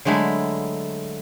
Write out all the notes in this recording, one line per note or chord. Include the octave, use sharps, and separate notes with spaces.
D3 F#3 G#3 A3 E4